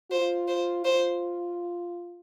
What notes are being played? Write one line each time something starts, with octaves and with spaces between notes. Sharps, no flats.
F4 C5
C5
F4 C5